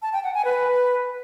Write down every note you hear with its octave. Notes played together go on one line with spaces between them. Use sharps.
A5
G5
F#5
G#5
B4